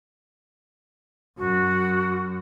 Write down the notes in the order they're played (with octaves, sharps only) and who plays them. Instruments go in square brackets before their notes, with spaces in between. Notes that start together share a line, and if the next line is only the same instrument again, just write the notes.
[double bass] F#2 [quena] F#4